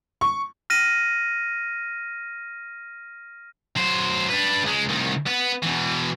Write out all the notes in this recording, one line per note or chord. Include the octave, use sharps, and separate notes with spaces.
C#6
F6 A#6 D#7
F#3 C5
D4 B4
C#2 G#3
C2 D#3
B3 B4
B2 E3